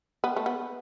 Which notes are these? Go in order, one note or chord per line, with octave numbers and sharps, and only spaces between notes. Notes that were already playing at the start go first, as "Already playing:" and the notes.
B3
A3
B3